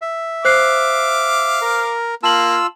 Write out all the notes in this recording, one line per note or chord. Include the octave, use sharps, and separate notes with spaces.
E5
C5 F5 D6 F#6 C7
A#4
A#3 F4 A5 E6 F#7